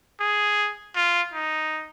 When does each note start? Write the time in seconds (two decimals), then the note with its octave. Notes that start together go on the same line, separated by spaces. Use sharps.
0.20 G#4
0.95 F4
1.34 D#4